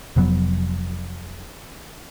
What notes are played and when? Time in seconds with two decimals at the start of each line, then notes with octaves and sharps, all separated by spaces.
0.16 F1 F3 F#3 B3